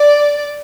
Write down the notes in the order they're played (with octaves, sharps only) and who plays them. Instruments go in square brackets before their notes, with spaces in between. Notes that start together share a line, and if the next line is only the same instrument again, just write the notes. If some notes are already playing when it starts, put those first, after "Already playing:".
Already playing: [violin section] D5